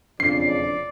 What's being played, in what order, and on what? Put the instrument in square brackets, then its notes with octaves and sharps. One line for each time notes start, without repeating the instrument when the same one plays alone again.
[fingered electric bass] E1 D4 [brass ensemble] F2 C#3 [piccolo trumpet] D5 [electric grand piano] C7